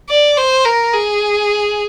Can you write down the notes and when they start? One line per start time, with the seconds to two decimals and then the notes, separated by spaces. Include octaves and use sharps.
0.09 D5
0.37 C5
0.65 A#4
0.93 G#4